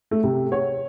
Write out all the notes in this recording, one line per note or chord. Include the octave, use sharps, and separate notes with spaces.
A3
C3
C#5